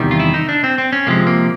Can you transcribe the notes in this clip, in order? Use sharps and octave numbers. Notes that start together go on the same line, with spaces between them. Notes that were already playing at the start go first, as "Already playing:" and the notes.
Already playing: E2 C3 D#3 G3
F4
E4
D#4
D4
C4
C4
C#4
C3 F3 G#3 A#3
A#3